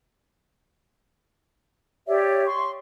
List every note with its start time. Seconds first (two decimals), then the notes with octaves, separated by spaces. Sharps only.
2.07 G4 C#5 D5 E5
2.45 C6 C#6